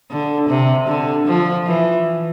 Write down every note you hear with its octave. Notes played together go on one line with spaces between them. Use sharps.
D3
C3
D3
F3
E3